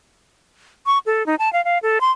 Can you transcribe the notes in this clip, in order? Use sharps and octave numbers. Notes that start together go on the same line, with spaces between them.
C#6
A4
D#4
A5
F5
F5
A4
C6